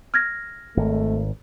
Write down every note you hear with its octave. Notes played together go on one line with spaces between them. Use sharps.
F6 G#6 A#6
G#1 A3